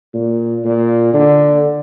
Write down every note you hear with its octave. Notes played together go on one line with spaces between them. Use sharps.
A#2
A#2
D3